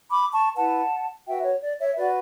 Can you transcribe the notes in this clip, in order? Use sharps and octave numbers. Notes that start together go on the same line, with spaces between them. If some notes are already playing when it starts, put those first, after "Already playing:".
B5 D6
A5 C#6
E4 B4 F#5 A5
F#4 B4 E5 G5
C#5
D5
C#5 E5
F#4 B4 D5